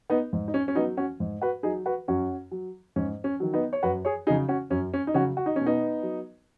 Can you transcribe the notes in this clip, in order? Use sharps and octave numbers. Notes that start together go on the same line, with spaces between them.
B3 D#4
G#2
D#4
C#4
C#4
F#3 B3 D#4
C#4 F#4
G#2
F#4 B4
F#3 D#4 G#4
F#4 B4
F#2 C#4 F#4
F#3
G#2 C#4
C#4
D#3 F#3
B3 D#4
C#5
F#2 F#4 B4
G#4 C#5
C#3 F#3 D#4 G#4
C#4 F#4
F#2 C#4
C#4
D#4
C#3 F#3 C#4 F#4
F#4
D#4
B2 C#4
B3 D#4
F#3